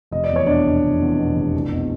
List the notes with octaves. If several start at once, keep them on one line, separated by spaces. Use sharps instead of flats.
F1 D#5
D5
E2
C#5
B2 D4 D5
F1
F1
E2
B2
F1
C2
B2